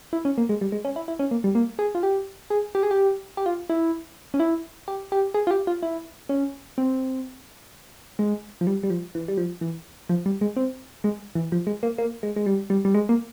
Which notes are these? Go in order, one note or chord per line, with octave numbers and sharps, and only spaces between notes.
E4
C#4
A#3
G#3
G3
G#3
C#4
E4
E4
C#4
A#3
G3
A#3
G#4
F4
G4
G#4
G4
G#4
G4
G4
F4
E4
C#4
E4
G4
G4
G#4
F4
G4
F4
E4
C#4
C4
G#3
F3
G3
G3
F3
E3
G3
F3
E3
F3
G3
G#3
C4
G#3
E3
F3
G#3
A#3
A#3
G#3
G#3
G3
G3
G3
G#3
A#3